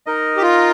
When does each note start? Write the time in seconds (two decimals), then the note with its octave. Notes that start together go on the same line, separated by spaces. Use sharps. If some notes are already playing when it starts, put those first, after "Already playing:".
0.06 D#4 A#4 D#5
0.37 G4
0.42 F4